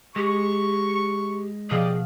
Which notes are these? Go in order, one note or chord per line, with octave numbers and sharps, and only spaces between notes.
G#3 G4 C#6
B2 F3 G4 G#4 D5 D#5 F6